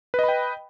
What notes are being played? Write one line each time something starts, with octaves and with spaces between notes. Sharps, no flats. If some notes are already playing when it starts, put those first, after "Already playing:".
B4 D#5 G5 B5